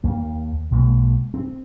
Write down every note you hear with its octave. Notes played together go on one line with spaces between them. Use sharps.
D#2 A#3
B1 B2 G#3 A#3
C4